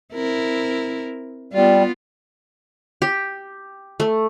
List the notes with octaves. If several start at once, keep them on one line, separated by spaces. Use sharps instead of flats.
C4 E4 A#4
G3 B3 F4
G4
A3